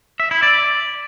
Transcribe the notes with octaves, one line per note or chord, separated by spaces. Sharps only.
E5
E4
D5